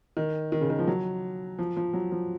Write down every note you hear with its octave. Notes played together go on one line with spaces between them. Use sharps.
D#3
D#3
C#3
D#3
F3
F#3
F3
F3
F#3
F3